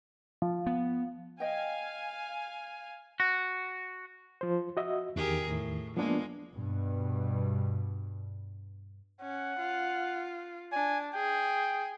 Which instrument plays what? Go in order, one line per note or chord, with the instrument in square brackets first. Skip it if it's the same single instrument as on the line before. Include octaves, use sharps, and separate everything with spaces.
[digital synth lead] F3
[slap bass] B3
[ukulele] D#5 G5 [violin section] F5 G#5
[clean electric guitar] F#4
[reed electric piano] F3 C5
F#4 D#5 E5
[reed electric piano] E2 D#3 [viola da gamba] G4 G#4 A#4
[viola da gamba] A2
[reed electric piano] F3 B3 D4 [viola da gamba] G#3 A#3
[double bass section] G2 B2
[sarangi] C#4 [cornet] F#5
[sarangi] F4
[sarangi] D4 [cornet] G#5
[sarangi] G#4 [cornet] G5